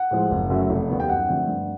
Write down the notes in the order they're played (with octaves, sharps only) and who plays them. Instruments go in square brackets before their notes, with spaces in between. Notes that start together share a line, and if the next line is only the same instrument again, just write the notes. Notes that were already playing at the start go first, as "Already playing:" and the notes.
Already playing: [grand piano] F#5
A2 F3 G#3
F#1
F#2 C#3 F#3 A3
F1
D#2 D#3 G3 B3
G5
F#2 F#5
D3 F3 A3 C4
G2